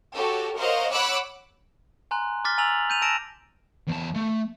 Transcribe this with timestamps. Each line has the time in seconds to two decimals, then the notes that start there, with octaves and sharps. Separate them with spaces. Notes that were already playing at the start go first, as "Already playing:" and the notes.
0.13 F#4 G4 A4 C#5
0.56 A#4 C5 C#5 D#5 F5 F#5
0.91 C#5 F#5 B5 D6 E6 F#6
2.11 G#5 A#5 C6 F#6
2.45 D6 F6 A6 B6 G7
2.58 G#5 A#5 E6 A6 F7 F#7
2.90 G6 D#7 F7
3.02 A5 E6 A#6 D7 E7 F7
3.89 E2 A5
4.16 A3